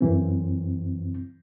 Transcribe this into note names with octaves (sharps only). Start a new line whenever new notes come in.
F#2 E3 C4